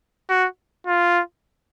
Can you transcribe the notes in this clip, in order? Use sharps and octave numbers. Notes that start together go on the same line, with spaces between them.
F#4
F4